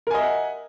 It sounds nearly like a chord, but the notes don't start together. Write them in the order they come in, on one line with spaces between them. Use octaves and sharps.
A#4 G#5 D#5 E5 F#5